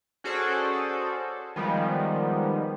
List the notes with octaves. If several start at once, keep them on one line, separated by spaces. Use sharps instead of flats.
C#4 F#4 G#4 A4 C5 D5
D#3 F3 G3 G#3 B3